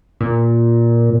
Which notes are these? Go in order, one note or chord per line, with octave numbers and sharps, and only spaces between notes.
A#2